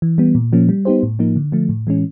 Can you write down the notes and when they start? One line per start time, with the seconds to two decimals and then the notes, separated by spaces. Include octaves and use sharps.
0.02 E3
0.18 G3 B3
0.35 A#2
0.53 F3 A#3 C#4
0.69 G3
0.85 B3 D#4 G4 C5
1.03 A2
1.19 F3 A#3 D#4
1.36 D3
1.52 F3 A3
1.69 A2
1.87 E3 G#3 C#4